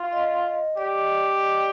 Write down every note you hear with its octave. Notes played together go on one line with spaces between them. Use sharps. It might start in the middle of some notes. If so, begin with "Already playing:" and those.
Already playing: F4
D#5
G4 D5